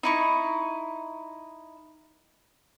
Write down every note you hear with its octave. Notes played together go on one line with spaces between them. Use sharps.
D#4 E4 C#6